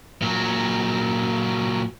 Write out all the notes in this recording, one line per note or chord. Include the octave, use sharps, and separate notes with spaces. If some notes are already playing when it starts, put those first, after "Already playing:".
A#2 F#3